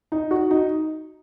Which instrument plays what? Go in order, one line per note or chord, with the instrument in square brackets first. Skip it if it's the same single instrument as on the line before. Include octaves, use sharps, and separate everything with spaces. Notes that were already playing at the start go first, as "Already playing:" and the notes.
[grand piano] D#4
F#4
D#4